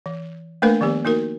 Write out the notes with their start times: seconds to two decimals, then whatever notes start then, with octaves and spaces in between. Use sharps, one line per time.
0.06 E3
0.62 A3 A#3 D4 A#4 B4 F5
0.81 D#3 F3 B3 G4
1.05 A#3 D#4 F#4 A#4